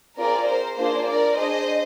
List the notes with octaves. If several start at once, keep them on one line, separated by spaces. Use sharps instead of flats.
C4 F4 G#4 A#4 D5
C5
A#3 D4 F4 G#4 C5
A#4 D5
D4 G#4 C5 D#5